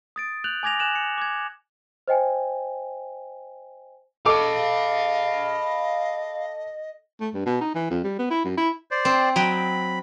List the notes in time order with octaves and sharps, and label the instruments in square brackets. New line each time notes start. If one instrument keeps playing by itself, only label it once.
[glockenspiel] D#6 A6 D7
F#6 G6 F7 F#7
G#5 D6 G#6 A#6 F7
G#5 F#6 E7 F#7
C#7
D6 G#6
[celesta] C5 D#5 G5 G#5
[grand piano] A4 D6 [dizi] D#5 [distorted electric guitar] F5 B5
[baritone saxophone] A3
G2
B2
D#4
E3
F2
G3
B3
E4
F#2
E4
[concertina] C5 D5
[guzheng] C4
[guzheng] F#3 D#5 G5 [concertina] B5